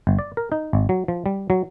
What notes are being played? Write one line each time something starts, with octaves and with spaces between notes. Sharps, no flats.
G1
D5
A#4
D#4
G#1
F#3
F3
G3
F#3